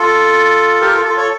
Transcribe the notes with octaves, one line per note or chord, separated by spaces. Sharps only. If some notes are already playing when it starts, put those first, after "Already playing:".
Already playing: F4 A4
G4 A#4
F4 A4
F4 A4
A4 C#5